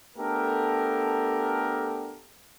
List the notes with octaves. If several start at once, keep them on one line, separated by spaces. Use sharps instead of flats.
A3 B3 D4 G4 A4 A#4